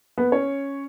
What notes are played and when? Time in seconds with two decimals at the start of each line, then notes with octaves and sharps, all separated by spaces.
0.18 B3 B4
0.32 C#4 C#5